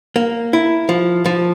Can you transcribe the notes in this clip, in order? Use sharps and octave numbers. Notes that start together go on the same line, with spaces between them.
A#3
E4
F3
F3